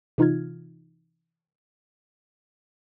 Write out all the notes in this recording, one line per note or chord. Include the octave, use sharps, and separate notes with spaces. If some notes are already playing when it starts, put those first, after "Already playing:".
C3 E3 D#4 F4 F6 G#6